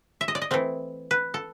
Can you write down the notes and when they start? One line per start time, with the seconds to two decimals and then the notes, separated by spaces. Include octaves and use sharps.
0.21 E5
0.28 D#5
0.35 D5
0.42 D#5
0.51 E3 A3 C4
1.11 B4
1.34 A4